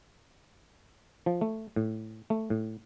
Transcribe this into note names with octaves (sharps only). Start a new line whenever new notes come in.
F3
A3
A2
A3
A2